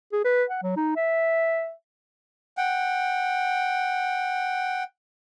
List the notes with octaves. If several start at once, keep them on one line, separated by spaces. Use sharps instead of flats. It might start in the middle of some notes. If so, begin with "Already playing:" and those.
G#4
B4
F#5
F#3
D#4
E5
F#5 G5